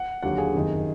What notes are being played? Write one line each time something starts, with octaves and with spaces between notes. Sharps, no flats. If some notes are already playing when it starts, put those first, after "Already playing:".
Already playing: F#5
D#2 D3 F#3 A#3 F#5
G#4
F#1 F2 D#3